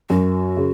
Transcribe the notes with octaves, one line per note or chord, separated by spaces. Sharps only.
F#2 F#4
C#3